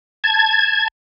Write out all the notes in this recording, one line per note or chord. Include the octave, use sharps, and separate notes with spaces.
A5 G#6